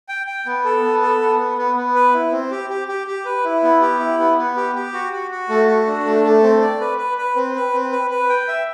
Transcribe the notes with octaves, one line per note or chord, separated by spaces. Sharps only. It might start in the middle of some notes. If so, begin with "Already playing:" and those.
G5
G5
B3
A4
B3
A4
B3
B3
B3
B3
B4
E4
C4
G4
G4
G4
G4
B4
E4
B3
G4
E4
B3
B3
G4
G4
F#4
F#4
F#4
A3
F#4
D4
A3
A3
C4
D5
B4
B4
B4
C4
B4
C4
B4
B4
G5
E5